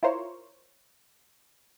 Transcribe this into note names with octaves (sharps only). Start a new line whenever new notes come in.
E4 F4 A#4 C5 C#5